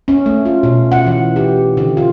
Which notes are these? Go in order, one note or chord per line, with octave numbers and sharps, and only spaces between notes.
C#4
A3
F4
B2
F#5
E3
G4
D3
F4